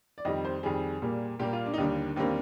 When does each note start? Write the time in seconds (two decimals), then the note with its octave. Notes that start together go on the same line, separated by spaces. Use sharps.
0.18 D5
0.25 F2 D#3 G3 D#5
0.45 C5
0.63 F2 D#3 G3 G#4
1.02 A#2 G3 A#3
1.39 A#2 G3 A#3 G4
1.53 F4
1.66 D4
1.74 D#4
1.78 D#2 D3 G3 A#3 D4
2.16 D#2 D3 G3 A#3 C4